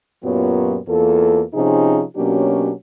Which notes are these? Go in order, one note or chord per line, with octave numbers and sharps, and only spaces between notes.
F#2 A#2 F#3 B3 F4 G4
E2 A#3 F4 A4
C3 F3 C#4 D#4 G#4
B2 F#3 A#3 C#4 D4 G4